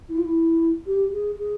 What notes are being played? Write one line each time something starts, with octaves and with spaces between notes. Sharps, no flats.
E4
F4
E4
G4
G#4
G#4